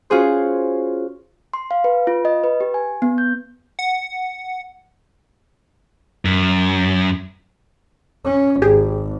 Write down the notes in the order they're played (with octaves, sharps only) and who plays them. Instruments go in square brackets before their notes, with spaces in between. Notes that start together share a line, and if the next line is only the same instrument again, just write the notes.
[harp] C#4 F4 F#4 G#4 C5
[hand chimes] C6
F5
B4
F4
D#5
B4
G4
G#5
B3
G6
[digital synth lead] F#5
[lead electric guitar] F#2
[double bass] C#4
[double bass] G#1 [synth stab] G4 G#4